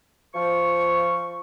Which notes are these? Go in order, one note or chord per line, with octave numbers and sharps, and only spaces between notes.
F3 C#6